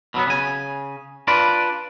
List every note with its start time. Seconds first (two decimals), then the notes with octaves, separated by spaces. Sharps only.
0.14 B2 F#3 B3
0.27 C#3 G#5
1.27 D4 F4 B4 D5